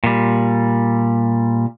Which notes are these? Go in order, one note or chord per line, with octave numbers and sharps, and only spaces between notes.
A#2 G3